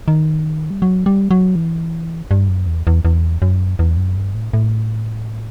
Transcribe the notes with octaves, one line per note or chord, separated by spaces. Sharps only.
D#3
G3
F#3
G3
F#3
E3
G2
F#2
E2
E2
E2
F#2
E2
F#2
G2
A2
A2